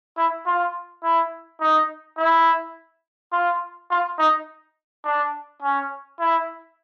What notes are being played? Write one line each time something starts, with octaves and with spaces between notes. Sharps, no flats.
E4
F4
E4
D#4
E4
F4
F4
D#4
D4
C#4
E4